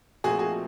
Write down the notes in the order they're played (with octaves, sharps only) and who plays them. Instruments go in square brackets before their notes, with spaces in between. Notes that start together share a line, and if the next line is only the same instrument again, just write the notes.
[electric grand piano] A#2 F3 A3 C4 D#4 [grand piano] F#4 G#4
[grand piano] F#4 G#4